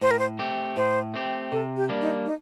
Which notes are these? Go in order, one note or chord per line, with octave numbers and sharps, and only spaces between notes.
A2 C5
A#4
C5
A3 C4 G4
A2 C5
A3 C4 G4
C3 A4
G4
G3 A#3 D4
D#4
D#4